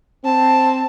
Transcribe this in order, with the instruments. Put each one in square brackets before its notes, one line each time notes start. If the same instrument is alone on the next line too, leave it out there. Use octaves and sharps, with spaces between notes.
[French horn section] C4 [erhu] A5